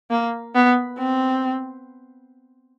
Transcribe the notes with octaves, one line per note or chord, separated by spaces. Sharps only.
A#3
B3
C4